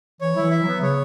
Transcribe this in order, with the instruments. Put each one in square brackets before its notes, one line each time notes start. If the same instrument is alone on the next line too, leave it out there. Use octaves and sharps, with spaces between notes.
[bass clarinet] E3 [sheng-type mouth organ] C#5
[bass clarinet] F#3 [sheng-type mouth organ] E4
[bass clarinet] E3
[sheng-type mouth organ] E5
[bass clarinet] F#3 [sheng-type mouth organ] B3
[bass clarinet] C#3 [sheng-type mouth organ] C#5